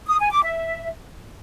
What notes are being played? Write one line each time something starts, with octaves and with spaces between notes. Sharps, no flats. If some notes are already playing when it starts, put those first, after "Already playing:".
D#6
G#5
D6
E5